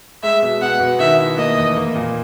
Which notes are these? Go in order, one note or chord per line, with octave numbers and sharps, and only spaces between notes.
G#3 E5
B2
B3 F#5
B2
D#3 E5
E4
A#3 D#5
E2
A#3
A#2